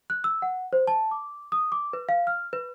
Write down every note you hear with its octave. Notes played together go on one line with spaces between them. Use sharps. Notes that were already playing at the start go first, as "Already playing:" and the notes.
F#6
E6
F#5
C5
A5
D6
D#6
D6
B4
F5
F6
B4